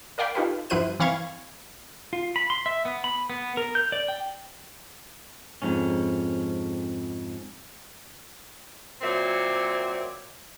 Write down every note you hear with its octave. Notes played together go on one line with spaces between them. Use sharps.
A#4 D5 F5 G5 B5
D#4 F4 G4 A4 B4
G2 F3 E4 C5 F#6 D#7
E3 C4 F5 B5 C#6 G#6
F4
B5
C6
E5
B3
B5
B3
A#4
G6
D5
G5
F2 G#2 C#4
A#2 F#3 C4 D5 E5